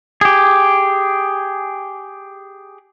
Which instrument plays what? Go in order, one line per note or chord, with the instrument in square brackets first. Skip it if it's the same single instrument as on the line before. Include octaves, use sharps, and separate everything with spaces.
[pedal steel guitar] G4 G#4